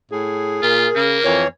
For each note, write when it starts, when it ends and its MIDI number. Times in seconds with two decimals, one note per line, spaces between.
0.11 0.60 45
0.11 1.01 68
0.62 0.88 46
0.62 0.87 65
0.62 1.36 70
0.95 1.19 49
0.95 1.44 58
1.25 1.44 41
1.25 1.48 52
1.25 1.48 73